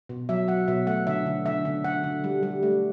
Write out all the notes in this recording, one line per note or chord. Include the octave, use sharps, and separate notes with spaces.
B2
F#3 E5
F#3 F#5
B2 E5
A3 F#5
D3 E5
D3
D3 E5
D3
D3 F#5
D3
G3
G3
A3